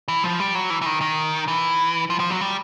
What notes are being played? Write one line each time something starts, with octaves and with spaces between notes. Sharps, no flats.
E3
F3
G3
F#3
E3
E3
D#3
D#3
E3
F3
F3
F#3
G3